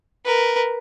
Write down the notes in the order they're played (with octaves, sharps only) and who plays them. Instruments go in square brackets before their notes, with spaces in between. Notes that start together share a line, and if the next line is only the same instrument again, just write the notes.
[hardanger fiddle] A#4 B4